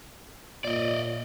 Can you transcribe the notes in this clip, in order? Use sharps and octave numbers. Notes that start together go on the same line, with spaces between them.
A#2 D5 D#5